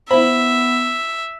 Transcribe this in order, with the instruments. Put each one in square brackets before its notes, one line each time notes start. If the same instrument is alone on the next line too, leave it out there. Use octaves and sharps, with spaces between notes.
[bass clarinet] B3 [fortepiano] E4 B5 [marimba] C5 [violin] E5